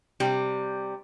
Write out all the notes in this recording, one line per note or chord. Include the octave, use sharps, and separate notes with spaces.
C3 G3